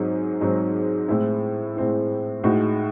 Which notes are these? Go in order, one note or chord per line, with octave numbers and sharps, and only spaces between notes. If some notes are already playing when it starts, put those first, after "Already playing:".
Already playing: G#2 F#3 C4 D#4 G#4
G#2 F#3 C4 D#4 G#4
A2 G#3 C4 E4
A2 G#3 C4 E4
A2 G#3 D#4 F#4